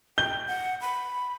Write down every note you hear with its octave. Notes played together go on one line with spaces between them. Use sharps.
G5 G6 G7
F#5
B5